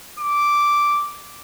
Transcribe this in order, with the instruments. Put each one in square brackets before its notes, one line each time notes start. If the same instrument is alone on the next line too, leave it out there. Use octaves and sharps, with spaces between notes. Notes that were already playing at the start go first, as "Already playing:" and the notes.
[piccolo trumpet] D6